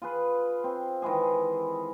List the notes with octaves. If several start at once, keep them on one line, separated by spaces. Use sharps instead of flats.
F4 G#4 B4
C4
D#3 E3 G#3 G#4